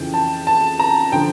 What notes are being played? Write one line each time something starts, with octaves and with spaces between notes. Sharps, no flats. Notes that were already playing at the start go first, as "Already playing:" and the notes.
Already playing: F2 C#3 E3 G5
A5
A5
A#5
D3 F3 G5